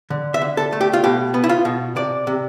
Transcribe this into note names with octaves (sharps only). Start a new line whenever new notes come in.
D3
E5
D3
A4
A3
G4
F4
B2 G4
B3
E4
F4
B2
C3 D5
C3